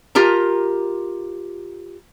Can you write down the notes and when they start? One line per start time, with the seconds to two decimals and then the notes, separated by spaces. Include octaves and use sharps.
0.15 F4 G4 A#4 A#5